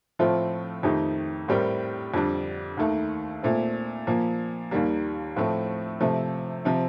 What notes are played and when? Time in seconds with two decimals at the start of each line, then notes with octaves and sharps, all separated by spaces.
0.19 A2 F3 A3 C4 F4
0.83 F2 D#3 A3 D#4 G4
1.48 A2 G3 C4 G4 A#4
2.14 F2 D3 G3 D4
2.77 D#2 D#3 A3
3.43 A#2 A3 C4
4.07 A#2 F3 A#3
4.71 D#2 D#3 G3 A#3
5.36 A2 F3 A3 C4
6.01 C3 F3 A3
6.65 C3 F3 C4